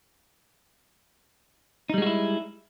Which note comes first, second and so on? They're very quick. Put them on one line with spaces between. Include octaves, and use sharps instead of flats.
D#4 G3 G#3 F#4 E4